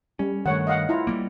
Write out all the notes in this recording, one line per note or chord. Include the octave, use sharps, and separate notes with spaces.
G3 C#4
G2 D#3 A3 C#5 F#5
D#5 F5 F#5
E4 F4 A#5
G3 G#3 A#3